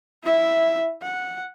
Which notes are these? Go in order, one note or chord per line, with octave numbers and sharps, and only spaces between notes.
E4 E5
F#5